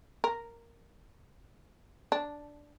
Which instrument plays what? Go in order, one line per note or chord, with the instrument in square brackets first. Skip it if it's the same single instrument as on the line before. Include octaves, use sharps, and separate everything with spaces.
[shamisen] A#4
D4